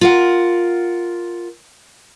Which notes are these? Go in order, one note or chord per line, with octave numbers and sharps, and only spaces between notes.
F4 A#4 F#5